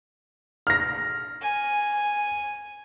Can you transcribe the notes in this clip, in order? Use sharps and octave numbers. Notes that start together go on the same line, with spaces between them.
F6 A#6
G#5